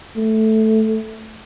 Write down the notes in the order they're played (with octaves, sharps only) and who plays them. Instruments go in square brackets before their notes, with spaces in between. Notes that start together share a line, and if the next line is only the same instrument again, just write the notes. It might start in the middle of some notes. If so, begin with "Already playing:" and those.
[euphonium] A3